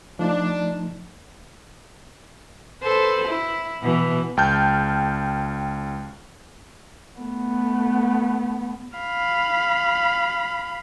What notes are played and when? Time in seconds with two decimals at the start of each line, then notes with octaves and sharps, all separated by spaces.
0.19 F3 A3 D4 D#4
2.83 A4 B4 C5
3.27 E4
3.81 B2 E3
4.37 C#2 G5 A5 F6 G6
7.19 A3 B3
8.98 F5 B5